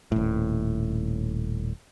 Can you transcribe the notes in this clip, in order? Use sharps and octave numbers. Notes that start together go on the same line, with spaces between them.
D#1 A2